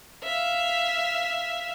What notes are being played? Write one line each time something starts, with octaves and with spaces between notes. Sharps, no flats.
E5 F5